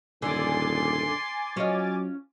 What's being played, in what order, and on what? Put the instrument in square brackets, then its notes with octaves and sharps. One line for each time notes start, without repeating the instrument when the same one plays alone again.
[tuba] D#1 [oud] F#2 D3 [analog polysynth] G#5 D6 A6 [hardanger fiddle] C6
[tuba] F#3 [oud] C#4 F4 D#5